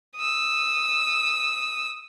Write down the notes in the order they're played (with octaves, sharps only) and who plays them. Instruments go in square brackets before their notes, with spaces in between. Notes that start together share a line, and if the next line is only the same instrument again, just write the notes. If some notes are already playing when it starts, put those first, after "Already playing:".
[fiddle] D#6 E6